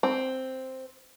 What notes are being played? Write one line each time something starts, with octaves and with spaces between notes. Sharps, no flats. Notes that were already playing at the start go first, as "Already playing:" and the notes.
C4